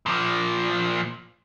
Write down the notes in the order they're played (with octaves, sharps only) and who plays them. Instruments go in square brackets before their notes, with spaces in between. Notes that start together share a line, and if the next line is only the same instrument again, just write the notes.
[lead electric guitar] A#2 F3